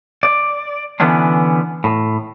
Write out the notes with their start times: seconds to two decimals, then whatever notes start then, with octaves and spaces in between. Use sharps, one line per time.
0.23 D5
1.00 D3 E3 B3 C#4 D4
1.84 A2